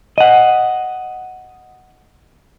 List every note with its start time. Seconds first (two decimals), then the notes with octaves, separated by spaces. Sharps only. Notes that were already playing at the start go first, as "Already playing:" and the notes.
0.18 D#5 F#5